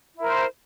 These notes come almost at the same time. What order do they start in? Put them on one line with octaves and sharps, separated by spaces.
E4 A#4 C5